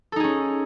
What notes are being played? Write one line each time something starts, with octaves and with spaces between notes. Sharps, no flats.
C#4 D#4 G#4 A4